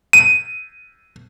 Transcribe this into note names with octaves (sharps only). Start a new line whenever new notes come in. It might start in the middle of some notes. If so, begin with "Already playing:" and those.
D#7